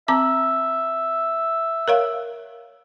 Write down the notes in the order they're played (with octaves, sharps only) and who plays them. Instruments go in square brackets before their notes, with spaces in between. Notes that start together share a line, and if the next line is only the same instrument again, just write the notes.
[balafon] C4 A#5 D6 [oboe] E5
[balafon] A#4 C#5 F5